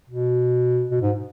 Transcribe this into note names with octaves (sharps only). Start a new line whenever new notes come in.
B2
B2
G#2